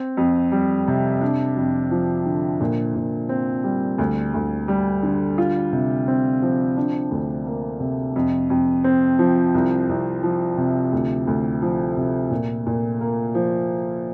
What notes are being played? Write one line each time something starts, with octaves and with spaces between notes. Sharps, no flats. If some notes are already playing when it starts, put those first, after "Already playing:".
Already playing: C4
F2
G3
C3
D4
F2
F3
D3
A#2
A#2
C4
G3
D2
D2
G3
D3
F4
C3
C4
F3
D4
D2
A#3
C3
F2
F2
C4
F3
C2
C2
F3
C3
D2
D2
F3
C3
A#2
A#2
A#3
F3